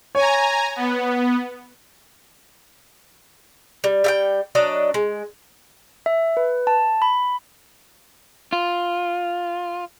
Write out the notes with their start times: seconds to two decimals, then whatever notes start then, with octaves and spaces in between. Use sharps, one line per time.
0.15 C#5 G#5 A#5
0.76 B3
3.84 G3
4.04 G3 E5 G5
4.55 F#3 D4 D#5
4.94 G#3
6.06 E5
6.37 B4
6.67 A5
7.02 B5
8.53 F4